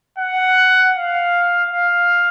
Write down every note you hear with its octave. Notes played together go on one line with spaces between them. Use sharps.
F#5
F5
F5